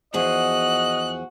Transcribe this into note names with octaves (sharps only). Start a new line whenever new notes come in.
E2 F3 F#4 G#4 D#5 F#6